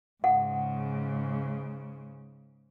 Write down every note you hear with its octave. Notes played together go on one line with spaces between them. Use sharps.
G#2 C#3 F#5